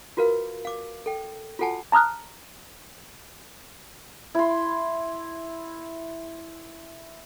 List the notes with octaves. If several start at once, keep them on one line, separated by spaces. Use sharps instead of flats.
F4 F#4 A#4 B4 F5
F5 D6
A4 G5
F4 F#4 A4 F#5 G#5 A5
A5 A#5 D#6 F6 F#6
E4 C6